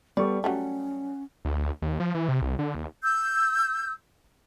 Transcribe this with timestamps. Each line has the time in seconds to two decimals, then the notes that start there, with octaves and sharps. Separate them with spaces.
0.17 G3 B3 A4 D5 C#6
0.44 F#3 G3 A3 C#4 F#5
1.45 D2
1.82 D#2
2.00 F3
2.15 E3
2.28 C3
2.42 C2
2.59 D3
2.75 D#2
3.02 E6 G6